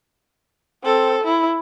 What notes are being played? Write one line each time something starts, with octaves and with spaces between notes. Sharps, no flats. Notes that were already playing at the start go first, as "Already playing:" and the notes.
C4 A4
E4